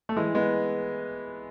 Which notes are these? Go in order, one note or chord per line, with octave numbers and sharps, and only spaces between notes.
A3
E3 G#3
G#3 B3